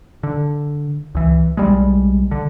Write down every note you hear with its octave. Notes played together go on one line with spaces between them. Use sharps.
D3
C#2 E3
B1 G3 G#3
D3